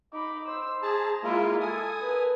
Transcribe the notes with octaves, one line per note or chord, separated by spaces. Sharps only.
D#4 B5 D6
C5 E6
G#4 A5 A#5
G#3 A#3 E4 F4
A4 G#5 D#6
A#4 B4